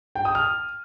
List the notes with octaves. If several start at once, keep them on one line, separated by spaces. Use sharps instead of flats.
G5
D#6
F6